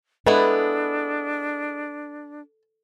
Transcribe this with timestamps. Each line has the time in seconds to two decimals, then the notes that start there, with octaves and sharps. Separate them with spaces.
0.26 G#3 B3 D4 E4 A4 B4